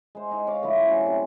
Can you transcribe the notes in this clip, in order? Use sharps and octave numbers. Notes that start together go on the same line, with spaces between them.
G#3 C5
D#4
C#5 F5 D6
D3 F3 A3 E4
F#3 C#4
C3